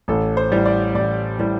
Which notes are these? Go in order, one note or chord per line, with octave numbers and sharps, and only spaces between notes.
A1 A4
C5
A2 G3
D5
A1 D5
A2 G3